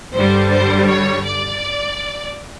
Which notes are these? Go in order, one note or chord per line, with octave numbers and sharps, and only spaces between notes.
G2 D3 G3 C5
C5
C#5
D5